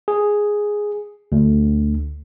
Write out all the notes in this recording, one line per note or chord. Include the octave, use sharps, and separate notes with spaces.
G#4
D2